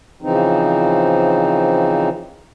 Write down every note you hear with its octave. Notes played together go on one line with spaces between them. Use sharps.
C#3 E3 F3 C4 D#4